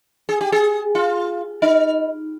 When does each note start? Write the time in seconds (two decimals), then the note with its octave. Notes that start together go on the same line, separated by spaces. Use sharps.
0.29 G#4
0.41 G4
0.52 G#4
0.95 F4
1.62 D#4